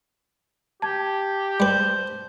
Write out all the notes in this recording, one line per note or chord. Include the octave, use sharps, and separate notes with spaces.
G4 A5 G#6
G3 B4 C5